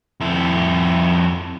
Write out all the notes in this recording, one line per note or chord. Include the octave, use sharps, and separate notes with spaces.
F2 E4